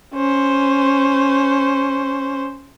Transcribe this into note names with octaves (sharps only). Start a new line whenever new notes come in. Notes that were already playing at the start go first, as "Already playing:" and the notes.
C#4 C5